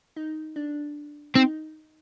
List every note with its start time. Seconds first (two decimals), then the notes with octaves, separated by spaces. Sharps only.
0.16 D#4
0.56 D4
1.35 C4 D#4